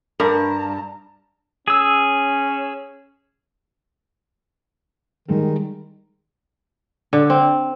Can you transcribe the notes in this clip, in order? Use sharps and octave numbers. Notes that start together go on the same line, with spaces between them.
G2 A#4 A5 A#5
C#4 G#4 E6
D#3 G3 G#3 D#4
D3
C4